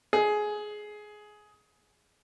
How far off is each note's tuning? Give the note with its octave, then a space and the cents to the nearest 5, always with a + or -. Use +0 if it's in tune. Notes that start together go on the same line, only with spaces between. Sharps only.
G#4 +15